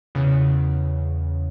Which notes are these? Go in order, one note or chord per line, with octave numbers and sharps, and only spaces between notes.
E2 C#3